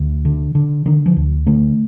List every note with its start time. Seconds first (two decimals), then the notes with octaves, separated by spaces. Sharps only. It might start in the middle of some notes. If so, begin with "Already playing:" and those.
Already playing: D2
0.25 D3
0.55 D3
0.86 D3 D#3
1.06 F3
1.16 D2
1.46 D3 A3